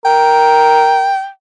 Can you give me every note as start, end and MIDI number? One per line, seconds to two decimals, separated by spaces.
0.05 1.11 70
0.05 1.29 79